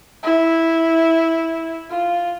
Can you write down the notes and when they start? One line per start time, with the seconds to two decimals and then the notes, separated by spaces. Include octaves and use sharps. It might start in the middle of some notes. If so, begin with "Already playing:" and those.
0.23 E4
1.89 F4